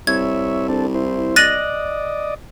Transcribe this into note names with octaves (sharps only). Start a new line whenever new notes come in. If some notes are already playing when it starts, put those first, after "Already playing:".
C2 C#5 E5 G#6
C4 D4 A4
E4 C5
D5 D#5 F#6 A6 A#6 D#7 F#7